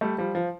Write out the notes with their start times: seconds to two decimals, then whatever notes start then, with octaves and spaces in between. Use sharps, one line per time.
0.01 G3 A3
0.18 F3 G3
0.35 F3